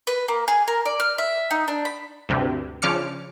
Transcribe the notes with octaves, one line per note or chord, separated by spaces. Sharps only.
B4
A#3
G#4
A#4
D5
F6
E5
D#4
D4
B5
D2 G2 C3
C#3 F3 D4 D6 F6 C#7